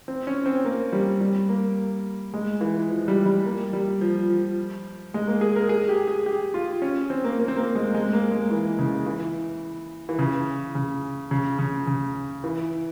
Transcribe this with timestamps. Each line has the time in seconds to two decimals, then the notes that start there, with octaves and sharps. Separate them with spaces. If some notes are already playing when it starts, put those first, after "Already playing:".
0.08 C4
0.27 C#4
0.46 C4
0.65 A#3
0.93 G3
1.21 G3
1.49 A#3
2.34 G#3
2.61 E3
2.90 F3
3.08 G3
3.26 G3
3.46 A#3
3.73 G3
4.01 F3
4.30 F3
5.14 G#3
5.27 A#3
5.41 G#4
5.56 A#4
5.69 G#4
5.89 G4
6.07 G#4
6.26 G4
6.54 F4
6.82 C#4
7.10 C4
7.24 A#3
7.38 A#3
7.48 C4
7.56 A#3
7.75 G#3
7.94 G#3
8.13 A#3
8.31 G#3
8.50 E3
8.79 C#3
9.06 E3
10.09 E3
10.19 C#3
10.75 C#3
11.31 C#3
11.59 C#3
11.87 C#3
12.44 E3